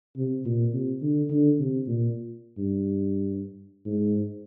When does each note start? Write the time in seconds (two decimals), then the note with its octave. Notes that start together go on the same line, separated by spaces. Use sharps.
0.17 C3
0.46 A#2
0.74 C3
1.02 D3
1.30 D3
1.59 C3
1.87 A#2
2.58 G2
3.86 G#2